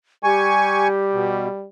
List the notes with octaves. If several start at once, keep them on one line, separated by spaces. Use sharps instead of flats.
G3 G4 G#5 C#6
B2